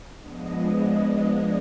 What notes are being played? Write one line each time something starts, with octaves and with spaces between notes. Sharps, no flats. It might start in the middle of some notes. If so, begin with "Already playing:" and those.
F3 G#3 B3 D4 D#5